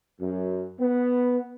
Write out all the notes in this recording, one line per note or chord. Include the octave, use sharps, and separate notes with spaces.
F#2
B3